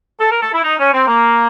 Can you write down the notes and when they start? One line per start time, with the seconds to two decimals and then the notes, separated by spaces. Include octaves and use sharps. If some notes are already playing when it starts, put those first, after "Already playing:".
0.20 A4
0.32 A#4
0.42 A4
0.53 E4
0.64 D#4
0.79 C#4
0.93 C4
1.08 A#3